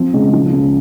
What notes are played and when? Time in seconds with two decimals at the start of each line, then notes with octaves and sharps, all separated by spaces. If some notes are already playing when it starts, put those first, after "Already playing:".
Already playing: F3 C4
0.13 C#3 G#3
0.33 F3
0.53 C#2